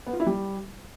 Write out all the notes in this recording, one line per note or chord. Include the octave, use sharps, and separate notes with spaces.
B3
F4
E4
G3